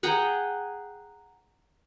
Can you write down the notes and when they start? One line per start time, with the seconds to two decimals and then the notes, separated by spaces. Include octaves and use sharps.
0.03 G#4 F#5 G5 A#5